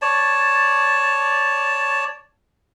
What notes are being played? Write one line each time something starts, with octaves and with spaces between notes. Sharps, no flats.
C#5 D5 A5